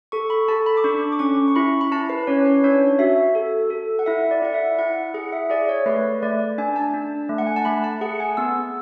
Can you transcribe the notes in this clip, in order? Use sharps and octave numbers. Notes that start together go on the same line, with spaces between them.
A4 C#6
B5
A4 A5
B5
D6
D4 C#6
D6
C#4 C#6
C#6
E4 B5
B5
E4 A5
B4
C#4 C#5
B4
D4 C#5
F#4 E5
A4
A4
F#5
E4 E5
D5
E4 F#5
E5
E4 F#5
G#4 F#5
E5
G#4 D5
C#5
A3 B4
A3 D5
D4 G#5
A5
D4
A3
F#5
G#5
A5
A3 B5
A5
G#4 F#5
G#5
B3 E6